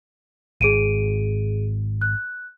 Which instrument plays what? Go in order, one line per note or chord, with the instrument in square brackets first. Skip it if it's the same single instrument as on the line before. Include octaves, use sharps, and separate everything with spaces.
[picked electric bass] G#1 [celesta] G#4 D7 D#7
[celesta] F#6